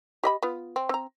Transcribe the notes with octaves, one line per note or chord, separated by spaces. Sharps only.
G4 D#5 B5
B3 F4
C4
C4 A#5